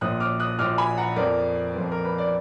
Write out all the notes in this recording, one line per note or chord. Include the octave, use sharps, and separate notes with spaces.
A#1 A#2 F3 D#6 F#6
D6 F6
D#6 F#6
A#1 A#2 F3 D6 F6
G#5 B5
F#5 A#5
F2 F3 B3 A#4 D5
F2 F3 B3
A#4
B4
D5